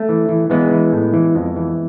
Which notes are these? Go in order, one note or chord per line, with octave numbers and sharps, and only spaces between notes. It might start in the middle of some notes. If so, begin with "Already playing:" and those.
Already playing: A3
E3
E3
E3 G#3 B3
E3
A2
E3
F2
E3